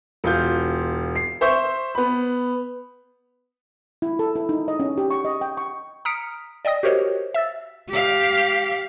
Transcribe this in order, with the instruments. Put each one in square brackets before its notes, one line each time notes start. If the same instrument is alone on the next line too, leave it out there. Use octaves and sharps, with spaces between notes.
[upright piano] E1 F4 G6
C7
C5 E5 C#6 G6
B3 B5
[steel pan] E4
A4
E4
D#4
D#5
C#4
G4
C#6
D#5
G5
C#6
[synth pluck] A#5 D#6 F6 B6 C#7 D7
D5 D#5 G5 D#6 A#6
F#4 G4 A#4 C5 C#5 D#5
E5 E6 A6
[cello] G4 F5